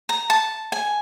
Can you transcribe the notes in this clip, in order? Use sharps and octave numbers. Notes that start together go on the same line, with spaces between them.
A#5
A5
G#5